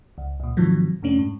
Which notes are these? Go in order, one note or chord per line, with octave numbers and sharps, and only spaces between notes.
C#2
C#2 A#2
G#2 C3 D#3 F3 F#3
F2 C3 A3 C#4 D4
G#2